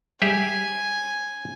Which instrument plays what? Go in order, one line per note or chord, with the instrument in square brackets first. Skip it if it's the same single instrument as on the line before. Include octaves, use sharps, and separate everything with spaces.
[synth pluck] G3 [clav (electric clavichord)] G4 G#4 E5 [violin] G#5